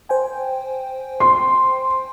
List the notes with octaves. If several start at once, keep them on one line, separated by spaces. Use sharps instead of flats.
C5 G5 G#5
C6